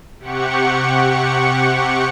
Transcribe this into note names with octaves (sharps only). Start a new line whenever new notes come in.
C3 G4 F#5 C#6 C#7